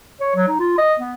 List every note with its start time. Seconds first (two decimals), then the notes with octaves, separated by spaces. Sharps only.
0.21 C#5
0.36 F#3
0.48 D#4
0.60 F4
0.78 D#5
1.00 B3